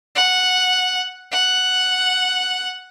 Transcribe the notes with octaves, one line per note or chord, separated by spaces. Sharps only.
F#5
F#5